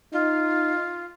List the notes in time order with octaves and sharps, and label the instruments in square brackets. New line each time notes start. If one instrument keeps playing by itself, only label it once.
[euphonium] D#4 [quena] F4